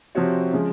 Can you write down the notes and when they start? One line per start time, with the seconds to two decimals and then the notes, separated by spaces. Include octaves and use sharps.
0.15 C3 F3 C4 F#4 C#5
0.53 C#3 F3 G#3